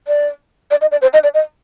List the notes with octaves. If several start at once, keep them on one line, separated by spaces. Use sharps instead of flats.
D5
D5
D#5
D5
C5
D#5
D5
D#5